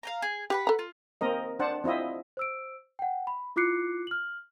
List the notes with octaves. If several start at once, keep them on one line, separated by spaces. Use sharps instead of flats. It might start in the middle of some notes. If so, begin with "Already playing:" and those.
F5 G5 A#5
G#4
G4 B4 F#5 B5
A4 A#5
F4
A#3 C4 A#4 D#5
D4 C5 F#5 A5
C4 E4 F4 D#5 E5
C5 E6 D7
F#5 G5
B5
E4 F4 D6 F#6 C7 C#7
F6 F#7